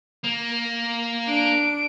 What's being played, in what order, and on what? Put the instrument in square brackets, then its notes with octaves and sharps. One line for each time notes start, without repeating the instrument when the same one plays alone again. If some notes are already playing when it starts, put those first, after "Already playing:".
[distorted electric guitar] A#3
[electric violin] D4 D7